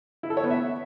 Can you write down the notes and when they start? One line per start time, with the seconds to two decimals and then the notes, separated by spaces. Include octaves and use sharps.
0.23 E4
0.30 A4
0.37 C#5
0.44 B3
0.51 E5